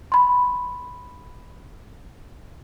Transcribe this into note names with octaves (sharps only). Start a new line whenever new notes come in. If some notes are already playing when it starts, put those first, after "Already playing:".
B5 C6